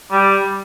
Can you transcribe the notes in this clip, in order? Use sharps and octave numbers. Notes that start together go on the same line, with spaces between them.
G3